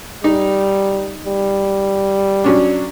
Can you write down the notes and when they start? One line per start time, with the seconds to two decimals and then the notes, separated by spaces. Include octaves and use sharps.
0.24 G3 D#4
1.27 G3
2.44 F#3 C#4 D4